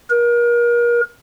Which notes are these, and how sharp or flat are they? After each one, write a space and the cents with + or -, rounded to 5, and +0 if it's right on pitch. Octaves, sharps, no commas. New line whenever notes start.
A#4 +35